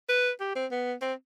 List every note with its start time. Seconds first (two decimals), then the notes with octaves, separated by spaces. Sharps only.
0.09 B4
0.40 G4
0.55 C4
0.72 B3
1.02 C4